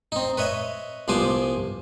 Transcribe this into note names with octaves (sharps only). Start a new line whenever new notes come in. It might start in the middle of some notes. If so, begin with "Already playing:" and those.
C4 D#4
B4 C#5 D#5 E5
C2 F3 B3 C5 G#5 D6